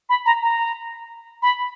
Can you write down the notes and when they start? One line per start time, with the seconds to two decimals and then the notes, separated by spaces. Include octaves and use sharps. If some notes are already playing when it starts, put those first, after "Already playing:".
0.09 B5
0.26 A#5
0.42 A#5
1.42 B5